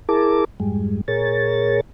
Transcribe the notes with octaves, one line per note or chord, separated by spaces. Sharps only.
E4 G#4 A#4 A5 D6
F2 G#2 G3 G#3
A#2 G#4 A#4 C#5 A6